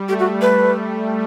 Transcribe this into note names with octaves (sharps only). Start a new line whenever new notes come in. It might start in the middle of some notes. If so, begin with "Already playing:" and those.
Already playing: G3
A3 G4
F#4
B4